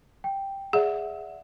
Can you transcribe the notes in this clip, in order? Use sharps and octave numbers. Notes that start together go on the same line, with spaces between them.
G5
G#4 D5 E5 F#5